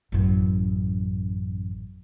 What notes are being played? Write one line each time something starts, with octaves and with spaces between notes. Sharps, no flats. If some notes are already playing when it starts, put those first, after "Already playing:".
A1 F#2